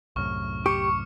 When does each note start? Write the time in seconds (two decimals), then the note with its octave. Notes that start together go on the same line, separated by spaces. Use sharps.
0.16 C2 F#2 A2 C#6 F6
0.66 G4 C#6 D6 C#7